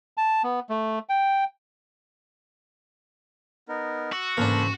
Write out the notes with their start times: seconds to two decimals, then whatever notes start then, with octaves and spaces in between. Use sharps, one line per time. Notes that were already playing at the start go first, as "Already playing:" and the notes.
0.17 A5
0.44 B3
0.69 A3
1.09 G5
3.69 B3 D#4 A#4
4.12 F#4 E6
4.37 G#2 C#3 E3 A#3 D4 A4 C5 B5